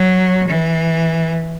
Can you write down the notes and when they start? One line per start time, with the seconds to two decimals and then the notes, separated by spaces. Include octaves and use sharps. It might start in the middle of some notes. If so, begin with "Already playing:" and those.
Already playing: F#3
0.48 E3